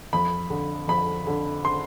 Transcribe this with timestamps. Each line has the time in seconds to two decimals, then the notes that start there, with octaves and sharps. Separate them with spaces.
0.13 F2 B5
0.50 D3
0.88 F2 B5
1.27 D3
1.65 C6